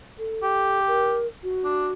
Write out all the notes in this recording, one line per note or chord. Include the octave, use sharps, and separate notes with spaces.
A4
G4
A#4
F#4
D4